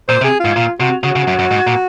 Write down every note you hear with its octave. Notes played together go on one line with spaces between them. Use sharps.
A#2 C5
C3
G#4
G#2 F4
A#2 F4
C3 F#4
C#3 F#4
C#3
F#2
F#2
G#2
A#2